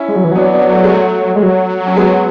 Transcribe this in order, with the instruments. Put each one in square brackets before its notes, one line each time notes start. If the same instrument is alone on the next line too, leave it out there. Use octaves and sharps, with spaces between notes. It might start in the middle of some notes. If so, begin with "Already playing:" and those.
Already playing: [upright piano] C#4 E4
[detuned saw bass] G#3
F#3
E3
[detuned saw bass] F#3 [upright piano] B3 D4
[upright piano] B3 D4
A3
G#3
A3
[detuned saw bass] G#3
F#3
[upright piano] C#4
G#3 B3